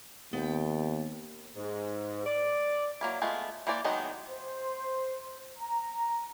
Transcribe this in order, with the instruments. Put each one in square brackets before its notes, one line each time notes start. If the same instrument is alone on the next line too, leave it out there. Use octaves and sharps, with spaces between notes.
[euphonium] D#2 [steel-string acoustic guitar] B3 G5
[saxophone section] G#2
D5
[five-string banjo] F#3 A#3 E4
G#3 A3 B3 F4
E3 A#3 C5 D5
D#3 F#3 G#3 B3 D#4
[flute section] C5
A#5